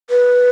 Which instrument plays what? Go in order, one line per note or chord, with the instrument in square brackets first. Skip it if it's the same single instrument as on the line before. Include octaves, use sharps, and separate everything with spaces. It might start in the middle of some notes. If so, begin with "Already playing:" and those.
[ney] B4